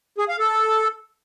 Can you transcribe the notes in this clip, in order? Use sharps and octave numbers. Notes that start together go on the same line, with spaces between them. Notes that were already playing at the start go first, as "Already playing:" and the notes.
G#4
F5
A4